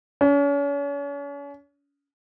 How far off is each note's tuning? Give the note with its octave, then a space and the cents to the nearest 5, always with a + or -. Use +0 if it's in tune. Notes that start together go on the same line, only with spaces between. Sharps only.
C#4 +40